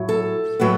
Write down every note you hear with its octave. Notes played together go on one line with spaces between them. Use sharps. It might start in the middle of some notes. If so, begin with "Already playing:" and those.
Already playing: A2 F#3
A4
A2 F#3 B3